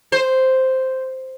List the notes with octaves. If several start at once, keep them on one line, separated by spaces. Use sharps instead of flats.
C5